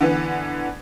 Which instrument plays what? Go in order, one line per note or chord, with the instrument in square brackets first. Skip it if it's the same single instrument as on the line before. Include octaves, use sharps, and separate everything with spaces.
[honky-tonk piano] D3 E3 B3